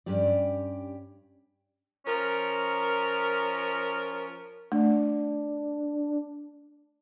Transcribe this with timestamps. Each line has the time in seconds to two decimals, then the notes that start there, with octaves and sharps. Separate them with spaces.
0.06 G2 C#4 G4 D5
2.06 F3 C#4 A#4
4.72 A3 D4